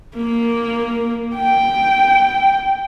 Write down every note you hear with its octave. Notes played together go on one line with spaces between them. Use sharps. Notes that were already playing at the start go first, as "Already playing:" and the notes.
A#3
G5